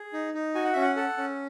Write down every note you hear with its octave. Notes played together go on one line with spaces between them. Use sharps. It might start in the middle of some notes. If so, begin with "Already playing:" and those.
Already playing: G#4
D#4
D#4
F#4 G#5
F#5
C#4 E5
F#5
A4 F#5
C#4